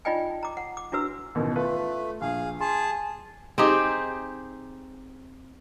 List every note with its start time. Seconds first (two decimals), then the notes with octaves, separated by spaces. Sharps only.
0.05 D#4 F4 D5 D#5 G5 G#5
0.43 A#5 D6
0.57 F#5
0.77 D6
0.92 D4 E4 F#4 B4 E6
1.35 A1 B2 D#3
1.56 A3 F4 A4 B4
2.21 A#1 G#4 F5
2.61 G#4 A5 C6
3.58 C4 D#4 G4 G#4